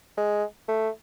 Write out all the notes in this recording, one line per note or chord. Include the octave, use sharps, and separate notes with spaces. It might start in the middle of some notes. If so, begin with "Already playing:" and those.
G#3
A3